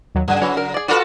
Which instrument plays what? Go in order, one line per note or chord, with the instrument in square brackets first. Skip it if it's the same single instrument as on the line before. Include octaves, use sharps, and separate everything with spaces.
[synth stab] D#2 F#3
[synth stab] G2 G#5 [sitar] C#3
[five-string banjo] E3 C#5 [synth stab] F#3
[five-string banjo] A#4
G#4 D5
[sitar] F4 F#4 A4 [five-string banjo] B4 D5 [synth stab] F6